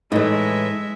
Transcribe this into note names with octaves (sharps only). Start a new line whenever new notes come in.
A2 E3 G#3 D#4 E5